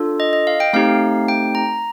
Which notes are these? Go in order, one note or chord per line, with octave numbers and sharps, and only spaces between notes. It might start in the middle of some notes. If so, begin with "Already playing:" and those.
Already playing: D4 F4 A4
D#5
D#5
F5
G5
A3 C4 D#4 G4 F5
G5
A#5